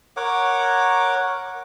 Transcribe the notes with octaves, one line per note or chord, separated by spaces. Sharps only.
A#4 C#5 F#5 D6